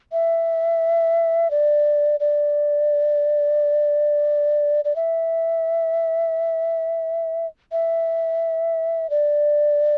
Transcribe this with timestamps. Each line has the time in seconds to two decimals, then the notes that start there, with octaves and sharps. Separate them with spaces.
0.12 E5
1.51 D5
2.20 D5
4.85 D5
4.96 E5
7.72 E5
9.10 D5